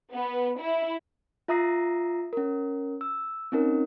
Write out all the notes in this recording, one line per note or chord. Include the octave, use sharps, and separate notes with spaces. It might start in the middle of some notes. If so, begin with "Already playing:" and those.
B3
E4
F4 E5 A#5 D#6 A#6 C7
C#4 A#4
E6
C4 C#4 D#4 A#4